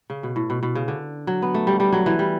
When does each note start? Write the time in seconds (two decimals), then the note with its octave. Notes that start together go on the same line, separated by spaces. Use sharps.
0.10 C#3
0.23 B2
0.36 A2
0.50 B2
0.63 B2
0.75 C#3
0.88 D3
1.27 F#3
1.42 B3
1.54 A3
1.67 G3
1.80 G3
1.93 F#3
2.06 E3
2.19 G3